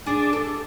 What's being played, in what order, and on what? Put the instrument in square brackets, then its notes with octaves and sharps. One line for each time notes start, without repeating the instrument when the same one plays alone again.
[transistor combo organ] D4 [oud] G#4
[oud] A4